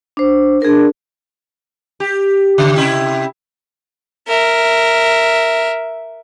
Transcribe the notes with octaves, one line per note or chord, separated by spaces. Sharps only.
D4 C5
D4 G#4 A#4
G4
C#3
C3 E4 G4
A#4 E5